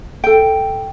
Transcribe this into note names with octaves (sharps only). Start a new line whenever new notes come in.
A4 G5